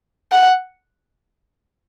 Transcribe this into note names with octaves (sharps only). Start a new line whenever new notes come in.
F#5